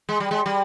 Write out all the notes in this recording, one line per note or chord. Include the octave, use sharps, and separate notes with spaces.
G#3
G3
G#3
G3